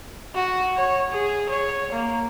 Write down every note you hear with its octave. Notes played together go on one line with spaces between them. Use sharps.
F#4
C#5
G#4
C#5
A#3